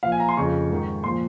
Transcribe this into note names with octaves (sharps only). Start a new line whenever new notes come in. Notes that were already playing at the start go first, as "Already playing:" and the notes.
A#2 F3 F5
G#5
A#5
C6
F2 C#3 F3 C#6
G#2 D#3
A#2 F3 C6